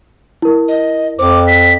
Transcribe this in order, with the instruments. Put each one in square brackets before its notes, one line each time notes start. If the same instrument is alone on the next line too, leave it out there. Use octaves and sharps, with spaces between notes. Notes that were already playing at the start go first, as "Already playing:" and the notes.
[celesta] E4 A#4
[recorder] D#5
[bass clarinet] F2 [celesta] C5 [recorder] D6
[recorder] B6